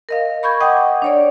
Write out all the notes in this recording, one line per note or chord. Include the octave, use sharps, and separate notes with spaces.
A#4 D#5 F5
B5 C#6 G6 G#6
D#5 F#5 G5 D6 D#6
D4 C#5 D5